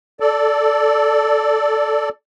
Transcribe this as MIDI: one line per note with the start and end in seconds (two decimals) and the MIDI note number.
0.20 2.09 69
0.20 2.09 74